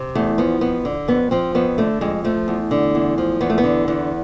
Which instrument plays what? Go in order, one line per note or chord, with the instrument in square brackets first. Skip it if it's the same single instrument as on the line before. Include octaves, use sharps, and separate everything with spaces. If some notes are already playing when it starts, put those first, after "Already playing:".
Already playing: [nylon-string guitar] C3
E2 A3
F3 B3
F2 B3
D3
F2 B3
F3 C4
F2 B3
D3 A3
F2 G#3
F3 A3
E2
D3
E2
F3
E2 B3
A3
B3
D3
E2 B3